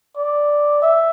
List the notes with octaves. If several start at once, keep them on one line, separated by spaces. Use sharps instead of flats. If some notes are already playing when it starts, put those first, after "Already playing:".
D5
E5